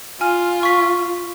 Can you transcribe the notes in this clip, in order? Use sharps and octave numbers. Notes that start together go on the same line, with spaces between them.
F4 G#5 F6
C#6 B6